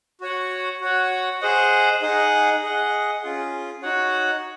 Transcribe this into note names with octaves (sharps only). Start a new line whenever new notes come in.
F#4 C#5 F#5
F#4 C#5 F#5
G#4 C5 D#5 F#5
D#4 G#4 D#5 F#5
G#4 D#5 F#5
C#4 F4 G#4
D#4 F#4 C#5 F#5